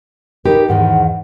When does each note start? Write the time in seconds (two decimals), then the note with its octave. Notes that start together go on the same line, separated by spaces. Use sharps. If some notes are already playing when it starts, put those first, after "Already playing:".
0.46 D#4 G4 A#4 B4
0.69 E2 G#2 D#3 F#5